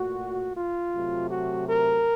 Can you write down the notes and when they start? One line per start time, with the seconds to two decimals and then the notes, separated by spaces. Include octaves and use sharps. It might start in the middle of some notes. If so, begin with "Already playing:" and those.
Already playing: A#2 A3 F#4
0.56 F4
0.93 C3 F#3 A3
1.31 F#4
1.68 A#4